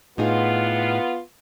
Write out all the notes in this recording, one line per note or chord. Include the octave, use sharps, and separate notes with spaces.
A2 B3 D#4 F4 G#4